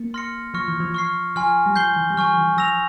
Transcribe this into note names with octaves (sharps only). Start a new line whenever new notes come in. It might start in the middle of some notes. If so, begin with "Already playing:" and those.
Already playing: A#3
C6 F6 A#6 C#7
F3 C#6 F6 A#6 C#7
E3
F3
C#6 F6 C7
F3 G#5 C6 F6
G3
F3 G6 C7 G7
E3
G3
F3 G#5 C#6 F6
E3
F3 E6 A#6 F7